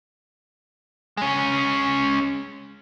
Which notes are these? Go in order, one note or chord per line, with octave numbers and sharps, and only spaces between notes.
G#3 C#4